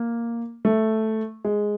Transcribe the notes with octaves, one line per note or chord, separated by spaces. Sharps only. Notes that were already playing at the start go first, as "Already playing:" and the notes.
Already playing: A#3
A3
G#3